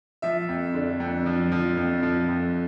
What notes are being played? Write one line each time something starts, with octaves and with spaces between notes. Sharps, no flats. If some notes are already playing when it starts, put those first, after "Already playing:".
F3 E5
F2
D3
F2
F3
F3
F2
F3
F2